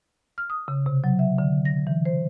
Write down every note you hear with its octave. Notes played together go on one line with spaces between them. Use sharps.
F6
D#6
C#3
C3
F#3
E5
D3
A#6
E3
C5